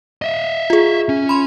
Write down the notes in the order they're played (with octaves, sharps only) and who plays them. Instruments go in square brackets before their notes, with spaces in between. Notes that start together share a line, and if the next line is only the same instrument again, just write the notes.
[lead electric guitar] D#5 E5
[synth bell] F4 G#4
[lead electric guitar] C#4
[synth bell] B5 C6